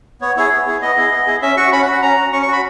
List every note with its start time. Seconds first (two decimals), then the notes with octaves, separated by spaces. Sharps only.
0.21 B3 C#5
0.37 E4 G#4 C#5
0.51 B3
0.67 E4 G#4
0.82 B3 D#5
0.97 E4 G#4
1.12 B3
1.27 E4 G#4
1.42 C#4 E5
1.57 F#4 C#6
1.72 C#4 B5
1.82 F#5
1.87 F#4
1.92 F#5
2.02 C#4 A#5
2.17 F#4
2.32 C#4 C#6
2.43 C#6
2.48 F#4 B5